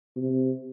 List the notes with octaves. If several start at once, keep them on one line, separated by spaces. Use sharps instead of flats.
C3